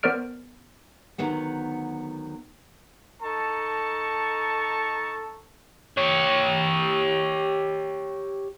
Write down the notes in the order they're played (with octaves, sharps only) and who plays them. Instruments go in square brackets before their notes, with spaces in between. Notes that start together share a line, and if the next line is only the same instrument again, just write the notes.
[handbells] B3 A#4 C5 D5 F6 D7
[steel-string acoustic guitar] D2 D#3 F#3 B3 F#5
[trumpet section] D#4 A4 A5 A#5 C#6
[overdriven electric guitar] G4 C#5